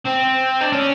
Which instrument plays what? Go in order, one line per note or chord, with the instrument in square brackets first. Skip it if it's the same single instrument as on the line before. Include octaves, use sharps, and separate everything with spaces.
[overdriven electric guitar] C4
D4
C#4